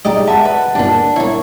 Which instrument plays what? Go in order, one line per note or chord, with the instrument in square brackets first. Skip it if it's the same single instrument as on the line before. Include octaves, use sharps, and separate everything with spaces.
[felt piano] G#3 [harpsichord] D#4 G4 D#5 [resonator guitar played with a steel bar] D5
[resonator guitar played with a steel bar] E5 [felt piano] F#5 A5
[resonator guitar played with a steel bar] B4
[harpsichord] G2 A#2 [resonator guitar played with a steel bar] D4
[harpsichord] A#3 E4 [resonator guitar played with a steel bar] C#5